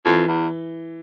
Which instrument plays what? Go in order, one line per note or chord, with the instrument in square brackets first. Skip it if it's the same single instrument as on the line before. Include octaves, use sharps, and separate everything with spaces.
[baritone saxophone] F2 [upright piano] E3
[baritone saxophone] E2